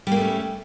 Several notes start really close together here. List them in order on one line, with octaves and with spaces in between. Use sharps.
G3 A#3 A3 C#4